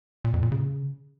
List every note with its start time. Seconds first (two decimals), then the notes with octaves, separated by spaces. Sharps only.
0.25 A#2
0.34 F2
0.43 A#2
0.52 C#3